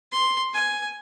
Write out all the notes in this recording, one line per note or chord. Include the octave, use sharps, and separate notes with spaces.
C6
G#5